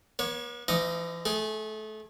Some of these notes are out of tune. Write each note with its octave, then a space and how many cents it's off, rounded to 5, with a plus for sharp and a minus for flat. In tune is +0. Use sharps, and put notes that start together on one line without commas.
B3 -45 C#5 +0
E3 +45 D#4 +20 D#5 +0
A3 -25 G#4 +5